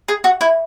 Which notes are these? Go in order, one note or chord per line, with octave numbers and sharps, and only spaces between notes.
G#4
F#4
E4